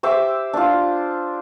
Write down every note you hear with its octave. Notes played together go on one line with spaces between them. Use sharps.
G4 C5 E5 D6
D4 F4